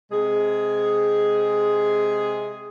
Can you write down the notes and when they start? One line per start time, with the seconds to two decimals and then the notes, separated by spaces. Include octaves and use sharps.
0.12 C3 G#3 G#4